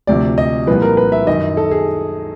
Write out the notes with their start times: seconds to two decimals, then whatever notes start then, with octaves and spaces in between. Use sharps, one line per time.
0.07 D2 C3 F3 D5
0.38 D#5
0.67 C2 A#2 F3 B4
0.82 A#4
0.97 B4
1.12 E5
1.27 F#2 D#3 D#5
1.57 A4
1.71 G#4